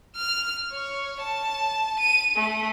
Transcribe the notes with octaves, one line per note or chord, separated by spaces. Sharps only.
F6
C#5
A5
D#7
A3